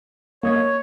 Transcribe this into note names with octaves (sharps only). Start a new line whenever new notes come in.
A#3 C#5 D#5 G#6